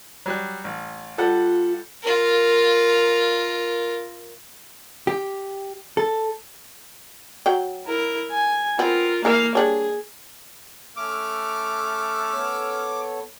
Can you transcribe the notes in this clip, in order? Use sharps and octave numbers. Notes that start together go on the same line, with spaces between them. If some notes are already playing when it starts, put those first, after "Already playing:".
F#3 G3 F#6
A1
G3 F4 A4 F#5
F4 A#4
G4
A4
F#3 G5
E4 A#4
G#5
B3 C4 F4 A#4
E3 A#3 A#4 E5 F5
G3 D4 G#4 C#5
A3 C#4 D6 E6 F6
B3 A4 C#5